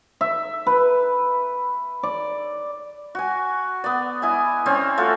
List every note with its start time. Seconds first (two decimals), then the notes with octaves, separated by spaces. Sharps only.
0.21 E5
0.66 B4
2.03 D5
3.15 F#4 G#5
3.84 B3 D5
4.22 E4 D#5 G#5
4.66 C4 C#4 C#5 D5
4.98 A3 F4 F#4 A4